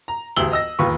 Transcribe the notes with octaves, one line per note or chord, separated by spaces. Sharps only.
A#5
E1 D2 G4 E6 F#7 G7
D#5 E6 A#6
E1 D#2 F4 B4 C#6